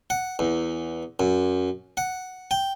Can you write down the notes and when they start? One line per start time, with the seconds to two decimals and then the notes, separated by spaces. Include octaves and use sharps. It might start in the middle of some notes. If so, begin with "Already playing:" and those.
0.10 F#5
0.39 E2
1.20 F#2
1.97 F#5
2.51 G5